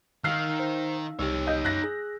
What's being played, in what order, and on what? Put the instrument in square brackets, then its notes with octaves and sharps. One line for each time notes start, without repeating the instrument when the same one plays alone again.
[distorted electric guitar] D#3 [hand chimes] D#4 F5 E6 [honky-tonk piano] F6 C7
[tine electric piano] C5
[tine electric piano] C2 G4 [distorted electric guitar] D#4 C#5 [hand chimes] E6
[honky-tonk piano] D#5 G6
[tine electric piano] F#2 [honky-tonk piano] F#6 A#6
[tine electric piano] G#4